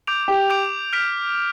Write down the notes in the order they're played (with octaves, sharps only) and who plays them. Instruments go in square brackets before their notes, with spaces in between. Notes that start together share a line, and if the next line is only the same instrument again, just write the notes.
[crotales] D6 G6 D7 F7
[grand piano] G4
[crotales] D6 G6 D7 F7
F6 B6 D7 F7